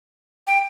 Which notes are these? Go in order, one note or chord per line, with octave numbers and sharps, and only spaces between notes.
G5